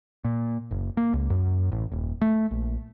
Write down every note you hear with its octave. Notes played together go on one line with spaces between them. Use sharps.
A#2
F#1
A#3
C#2
F#2
A1
D#1
A3
A#1